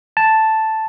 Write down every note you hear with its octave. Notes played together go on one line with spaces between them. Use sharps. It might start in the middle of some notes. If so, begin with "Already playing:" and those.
A5